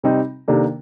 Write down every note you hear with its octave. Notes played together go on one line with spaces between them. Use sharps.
C3 G3 C4 D#4
C3 D#3 A#3 D4 A4